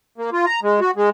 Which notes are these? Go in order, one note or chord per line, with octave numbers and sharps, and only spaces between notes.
A#3
F4
A#5
G#3
F#4
G#3